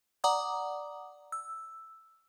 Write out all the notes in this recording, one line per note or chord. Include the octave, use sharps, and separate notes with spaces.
D5 F#5 A#5 D6 D#6
E6